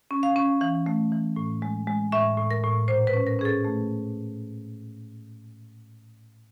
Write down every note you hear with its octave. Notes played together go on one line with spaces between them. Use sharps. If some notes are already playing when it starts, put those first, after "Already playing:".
C#4
F5
C#4
E3 F5
A3
E3
A2
G#3
G#3
A2 E5
A2
A#4
A2
A#2 C5
B4
C#4
A#4
C#4 G#4
A4
A3